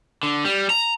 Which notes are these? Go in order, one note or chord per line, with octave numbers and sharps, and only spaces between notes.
D3
G3
A#5